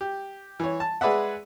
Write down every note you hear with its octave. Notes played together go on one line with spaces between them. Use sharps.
G4
E3 C#5
A5
G#3 G#4 B4 D5 E5 F#5